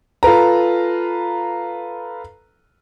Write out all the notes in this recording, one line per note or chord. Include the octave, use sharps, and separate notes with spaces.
F4 A4 B4 A#5